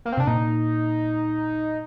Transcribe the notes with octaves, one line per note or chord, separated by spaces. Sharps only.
A#3
C4
C3 D4
A#2 D#4